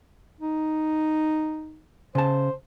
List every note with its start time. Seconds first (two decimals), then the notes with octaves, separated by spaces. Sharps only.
0.40 D#4
2.15 C#3 C5 A5